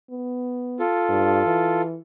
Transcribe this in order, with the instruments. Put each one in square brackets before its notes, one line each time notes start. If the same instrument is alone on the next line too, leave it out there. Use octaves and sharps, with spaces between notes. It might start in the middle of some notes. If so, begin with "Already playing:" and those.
[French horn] B3
[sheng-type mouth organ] F4 A4
[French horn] G2
E3